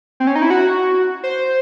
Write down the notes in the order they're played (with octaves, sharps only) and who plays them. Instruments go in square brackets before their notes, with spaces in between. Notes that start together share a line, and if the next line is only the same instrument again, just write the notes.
[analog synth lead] C4
C#4
D#4
E4
F#4
C5